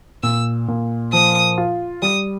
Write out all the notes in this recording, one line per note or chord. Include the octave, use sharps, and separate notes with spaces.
A#2 E6
A#2
F3 D#6
F4
G3 D#6